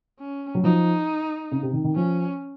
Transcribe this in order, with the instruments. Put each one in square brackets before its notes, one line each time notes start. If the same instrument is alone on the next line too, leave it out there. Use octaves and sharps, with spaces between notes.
[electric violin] C#4
[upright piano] F#3
[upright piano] F3 [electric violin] D#4
[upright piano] C#3
C3
D#3
D#3
[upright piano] F3 [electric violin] C#4